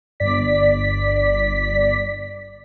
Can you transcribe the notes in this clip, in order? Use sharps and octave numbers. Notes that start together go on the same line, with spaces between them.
G1 D5 B6